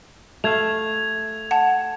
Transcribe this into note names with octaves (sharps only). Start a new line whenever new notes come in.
A3 F5 G#6 F7
F#5 A5